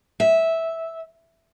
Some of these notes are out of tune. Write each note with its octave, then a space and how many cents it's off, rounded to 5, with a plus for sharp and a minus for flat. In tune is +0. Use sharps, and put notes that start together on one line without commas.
E5 -10